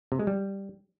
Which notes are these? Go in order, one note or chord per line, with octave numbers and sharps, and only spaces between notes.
C3
G#3
G3